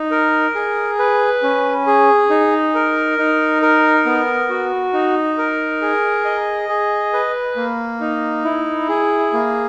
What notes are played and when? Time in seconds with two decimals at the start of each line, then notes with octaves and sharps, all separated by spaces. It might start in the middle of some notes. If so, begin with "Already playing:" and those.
Already playing: D#4
0.11 A#4
0.55 G#4
0.99 B4
1.43 C#4
1.87 G#4
2.30 D#4
2.75 A#4
3.18 D#4
3.62 A#4
4.06 B3
4.49 F#4
4.93 D#4
5.38 A#4
5.82 G#4
6.25 D#5
6.69 G#4
7.13 B4
7.56 A#3
8.01 D#4
8.45 E4
8.89 G#4
9.33 A#3